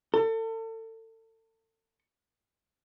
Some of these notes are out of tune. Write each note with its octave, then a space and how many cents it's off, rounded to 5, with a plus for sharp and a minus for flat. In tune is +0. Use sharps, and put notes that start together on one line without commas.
A4 +35